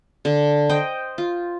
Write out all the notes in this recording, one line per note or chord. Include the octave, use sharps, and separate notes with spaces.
D3
C5 D#5 G5
F4